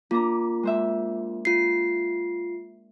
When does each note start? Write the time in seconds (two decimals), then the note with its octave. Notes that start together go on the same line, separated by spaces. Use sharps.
0.11 A#3 D4 F4 A#5
0.63 G#3 C5 E5
1.45 F4 C7